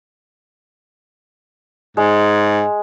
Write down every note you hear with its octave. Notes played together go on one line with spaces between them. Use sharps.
G#2 G#3